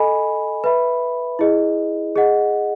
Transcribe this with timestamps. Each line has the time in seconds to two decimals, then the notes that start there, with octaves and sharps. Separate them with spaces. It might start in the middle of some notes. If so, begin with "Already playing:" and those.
Already playing: A4 D#5 G#5 B5
0.64 B4 E5 B5
1.39 E4 G#4 D#5
2.16 G#4 D#5 F#5